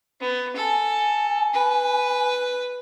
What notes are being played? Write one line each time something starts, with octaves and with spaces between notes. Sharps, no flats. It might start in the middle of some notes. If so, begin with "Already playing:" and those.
B3
A4 G#5
B4